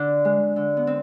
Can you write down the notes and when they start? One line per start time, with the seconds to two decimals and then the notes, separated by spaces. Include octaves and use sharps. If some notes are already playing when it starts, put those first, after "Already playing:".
Already playing: D3 D4
0.25 G#3
0.56 D3
0.77 B3
0.87 C4